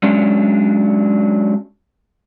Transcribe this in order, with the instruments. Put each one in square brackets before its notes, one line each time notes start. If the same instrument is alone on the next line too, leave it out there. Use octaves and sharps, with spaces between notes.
[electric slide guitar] F#3 G#3 C#4 D4